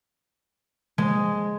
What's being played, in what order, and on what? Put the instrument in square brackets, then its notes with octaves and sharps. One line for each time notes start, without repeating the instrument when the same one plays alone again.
[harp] G#3